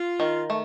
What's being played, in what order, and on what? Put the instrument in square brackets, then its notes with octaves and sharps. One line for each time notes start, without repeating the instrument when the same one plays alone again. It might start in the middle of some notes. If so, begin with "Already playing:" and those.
Already playing: [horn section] F4
[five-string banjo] D#3
A3